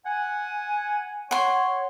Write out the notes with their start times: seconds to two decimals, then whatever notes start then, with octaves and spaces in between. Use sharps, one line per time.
0.06 F#5 G#5
1.31 C#5 F#5 C6